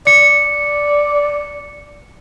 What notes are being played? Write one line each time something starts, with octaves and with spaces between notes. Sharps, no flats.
D5 C#7